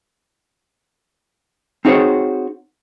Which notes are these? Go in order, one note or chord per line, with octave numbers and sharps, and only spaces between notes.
C4 D#4 F#4 G#4 C5 C#5